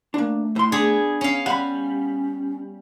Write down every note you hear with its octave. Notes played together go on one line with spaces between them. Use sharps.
A3 A#3 D4
A2 C6
B3 D4 G#4
C#4 F5
G3 C#4 F#5 B5